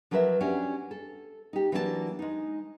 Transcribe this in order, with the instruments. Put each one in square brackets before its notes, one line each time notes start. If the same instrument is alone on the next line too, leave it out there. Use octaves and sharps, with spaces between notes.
[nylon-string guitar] F3 F#3 A#4 B4 C#5 E5
C#4 D4 F#4 G4
A4
D#4 G4
E3 F#3 A#3 D4 E4 A5
G#3 D#4